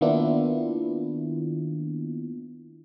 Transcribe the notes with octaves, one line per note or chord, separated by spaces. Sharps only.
D#3 A#3 B3 D4 E4 F4